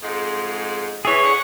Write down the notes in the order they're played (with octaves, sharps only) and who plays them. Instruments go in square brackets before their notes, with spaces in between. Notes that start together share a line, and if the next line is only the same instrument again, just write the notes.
[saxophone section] F2 G#2 G#3
[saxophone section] E3 [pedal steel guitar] G#4 C#5
[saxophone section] D3 F#5